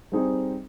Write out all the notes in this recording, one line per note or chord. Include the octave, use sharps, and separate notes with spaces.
G3 C4 D#4 G#4